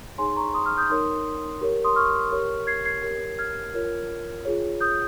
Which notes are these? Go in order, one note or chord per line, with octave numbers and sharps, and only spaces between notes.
D#4 G#4 C#5 G#5 C6
A#5 C#6
C6 D#6
C#6 F6
D#6 G6
D#4 A#4 C#5 C6 D#6
G4 A#4 C#5
C6 D#6
C#6 F6
G4 A#4 C#5
G#6 C7
G#6 C7
G4 A#4 C#5
F6 G#6
F4 A#4 C#5
F4 G#4 C#5
D#6 G6